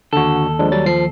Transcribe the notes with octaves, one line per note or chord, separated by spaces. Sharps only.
D#2 D3 F#4 A4
F3 G#3 D4
F#3 G3 A6
F3 C7